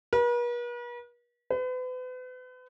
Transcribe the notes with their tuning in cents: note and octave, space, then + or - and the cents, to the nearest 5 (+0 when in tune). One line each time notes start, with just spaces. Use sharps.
B4 -45
B4 +40